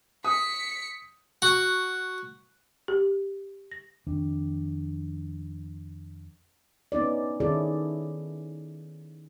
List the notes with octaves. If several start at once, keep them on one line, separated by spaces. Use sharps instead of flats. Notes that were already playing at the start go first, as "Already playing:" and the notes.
D#6 B6 C#7
F#4
G4
A#6
F2 D#3 D4
B3 C#4 D#4 D5
D#3 C#4 E4 G#4 A4 D5